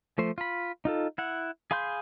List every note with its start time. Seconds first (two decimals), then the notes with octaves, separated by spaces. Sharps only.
0.18 F3 A3 C5
0.38 F4 B5
0.85 D#4 F4 A4
1.18 E4 F#5
1.71 G#4 F5 B5 C6 G6